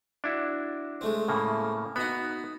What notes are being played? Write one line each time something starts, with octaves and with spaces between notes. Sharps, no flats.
D4 E4 F#4
G#3 A3 C4
A2 C#3 A#3
B3 D#4 F#4 B5